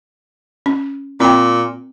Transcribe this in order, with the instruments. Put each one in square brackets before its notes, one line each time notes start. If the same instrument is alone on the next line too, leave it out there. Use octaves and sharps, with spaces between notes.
[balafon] C#4
[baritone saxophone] A#2 [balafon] C4 G5